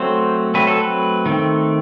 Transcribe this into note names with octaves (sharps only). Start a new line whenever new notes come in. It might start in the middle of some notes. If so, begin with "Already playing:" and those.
Already playing: F#3 A3 C4 C5
F#3 A3 C4 B4
A4
B4
D#3 A3 C4